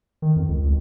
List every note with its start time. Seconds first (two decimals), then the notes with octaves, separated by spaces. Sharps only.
0.22 D#3
0.36 F2
0.49 C#2
0.64 C#2